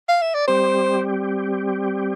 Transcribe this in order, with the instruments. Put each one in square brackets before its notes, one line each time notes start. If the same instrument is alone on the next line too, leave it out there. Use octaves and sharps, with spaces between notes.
[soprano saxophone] F5
E5
D5
[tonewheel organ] G3 C4 G4 [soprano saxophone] C5